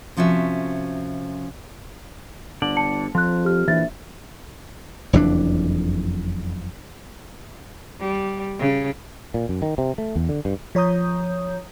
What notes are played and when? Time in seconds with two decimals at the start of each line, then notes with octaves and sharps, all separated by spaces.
0.17 C3 F3 C#4 F#4 E5
2.62 G1 D3 D5 F#7
2.77 A5 C#7
3.15 F2 F3 C6 F#6
3.45 G4 F6
3.68 A#1 E3 E5 A6
5.13 F#1 F2 E3 D4
7.99 G3
8.59 C#3
9.34 A#2
9.49 F#2
9.62 D#3
9.78 C3
9.98 A3
10.16 E2
10.29 D3
10.45 G2
10.75 F3 C#5 A#5 D#6 G6